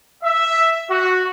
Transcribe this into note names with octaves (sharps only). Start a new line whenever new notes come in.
E5
F#4